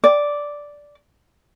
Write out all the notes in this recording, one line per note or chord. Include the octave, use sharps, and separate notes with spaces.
D5